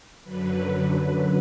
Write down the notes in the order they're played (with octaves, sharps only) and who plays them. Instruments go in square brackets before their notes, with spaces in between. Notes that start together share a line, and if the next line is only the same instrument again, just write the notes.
[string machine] F#2 D3 F#3 B4
B4